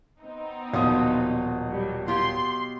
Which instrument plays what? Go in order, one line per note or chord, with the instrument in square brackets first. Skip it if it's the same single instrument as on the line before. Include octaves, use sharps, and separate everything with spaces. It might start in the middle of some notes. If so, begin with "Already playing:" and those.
[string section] B3 C4 D#4
[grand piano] D#1 D#6 [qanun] B2 F3 F#3
[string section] F#3 G3
[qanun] F4 G4 C#5 [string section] C6